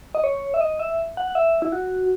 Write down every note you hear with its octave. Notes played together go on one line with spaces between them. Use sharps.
D#5
C#5
E5
D#5
E5
F#5
F#5
E5
E4
F#4